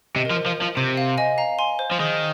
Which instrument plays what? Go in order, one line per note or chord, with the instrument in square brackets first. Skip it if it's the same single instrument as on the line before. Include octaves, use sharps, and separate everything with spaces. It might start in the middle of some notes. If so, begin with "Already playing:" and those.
[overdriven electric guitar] C3 [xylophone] D#5
[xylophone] A#4
[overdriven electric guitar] F3
[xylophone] C5
[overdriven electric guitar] F3
F3
[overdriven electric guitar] C3 [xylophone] C5
[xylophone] F5
D#5 G#5
F5 A#5
G#5 C6
C5
[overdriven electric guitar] F3
[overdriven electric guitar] D#3 [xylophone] G#4